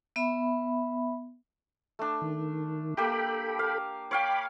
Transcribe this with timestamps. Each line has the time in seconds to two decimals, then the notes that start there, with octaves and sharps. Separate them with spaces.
0.16 B3 E5 B5
1.99 A3 D4
2.22 D#3
2.97 A#3 G4 A4 G5 B5
3.59 F5
4.11 C#5 F5 G5 B5 D6